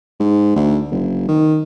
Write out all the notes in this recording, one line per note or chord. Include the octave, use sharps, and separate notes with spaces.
G#2
D2
F#1
D#3